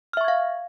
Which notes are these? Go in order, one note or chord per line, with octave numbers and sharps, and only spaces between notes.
E5 F5 C#6 F6 G#6